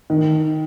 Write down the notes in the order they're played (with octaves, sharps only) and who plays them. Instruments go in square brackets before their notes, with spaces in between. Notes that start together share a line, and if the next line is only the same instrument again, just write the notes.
[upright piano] D#3